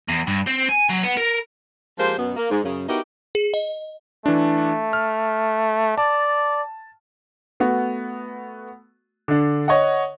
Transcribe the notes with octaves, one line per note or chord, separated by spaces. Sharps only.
E2
G2
C4
G#5
F#3
B3
A#4
F3 G#3 A#3 G4 C5
F#2 B2 B3
A#3
G#2
F#2 C#3
B3 D#4 E4 F#4 G4 A#4
G#4
D#5
E3 A3 D4
F6
D5 A5
A3 B3 F#4
D3 D4
C#5 D#5 F#5